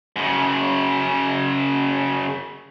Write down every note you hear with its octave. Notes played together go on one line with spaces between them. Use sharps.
F#2 C#3